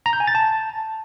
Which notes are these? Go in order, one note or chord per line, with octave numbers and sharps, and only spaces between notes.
A#5
G6
G#5
A6
A5